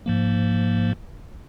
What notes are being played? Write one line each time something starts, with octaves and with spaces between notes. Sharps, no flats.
G#2 F3 A#3